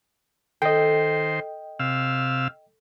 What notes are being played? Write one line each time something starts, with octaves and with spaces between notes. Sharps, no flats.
D#3 A4 C5 D#5 G5
C3 F5 E6